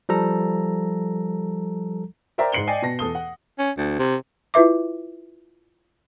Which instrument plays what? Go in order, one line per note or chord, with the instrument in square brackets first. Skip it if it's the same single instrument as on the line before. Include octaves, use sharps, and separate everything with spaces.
[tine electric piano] F3 G3 A4 A#5
[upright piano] A#4 C5 D5 E5 G5 A#5
G#2 C7 C#7 F#7 G7
D5 D#5 G5 G#5 C7
B2 A5 A#6
E2 A4 D#6 G7
F#5
[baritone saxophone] C#4
D2
C3
[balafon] E4 F4 B4 E5 D6